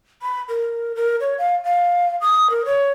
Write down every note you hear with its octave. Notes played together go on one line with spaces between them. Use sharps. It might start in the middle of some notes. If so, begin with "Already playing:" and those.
B5
A#4
A#4
C#5
F5
F5
D#6
A#4
C#5